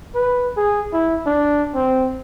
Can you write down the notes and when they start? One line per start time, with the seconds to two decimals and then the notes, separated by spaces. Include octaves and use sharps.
0.15 B4
0.57 G#4
0.93 E4
1.26 D4
1.74 C4